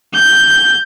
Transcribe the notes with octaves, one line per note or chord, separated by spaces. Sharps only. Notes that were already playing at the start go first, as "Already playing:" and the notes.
G6